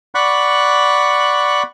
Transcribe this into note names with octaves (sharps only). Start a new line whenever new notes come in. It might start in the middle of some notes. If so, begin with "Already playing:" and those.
D5 F#5 B5 C#6 F#6